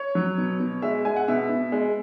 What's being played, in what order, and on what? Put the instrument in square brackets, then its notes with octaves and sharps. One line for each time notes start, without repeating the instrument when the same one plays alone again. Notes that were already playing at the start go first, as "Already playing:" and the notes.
Already playing: [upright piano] C#5
F#3
B2
B2
G#3 E5
G#3 G#5
F#5
B2 E5
B2
G#3